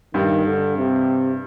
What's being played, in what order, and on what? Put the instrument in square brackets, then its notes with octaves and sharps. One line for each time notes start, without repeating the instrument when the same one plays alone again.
[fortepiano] G2 [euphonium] D#3
[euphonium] D3
C3